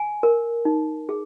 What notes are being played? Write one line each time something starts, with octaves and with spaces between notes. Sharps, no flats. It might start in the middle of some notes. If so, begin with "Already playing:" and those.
Already playing: G#5
A#4
D#4
G#4